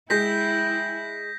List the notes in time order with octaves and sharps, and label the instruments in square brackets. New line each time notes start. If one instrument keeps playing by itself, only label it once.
[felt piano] G#3 [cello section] E4 [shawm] G5 [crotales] G6 A#6 B6